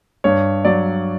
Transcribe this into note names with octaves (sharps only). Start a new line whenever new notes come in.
G2 C#5
F#3 D5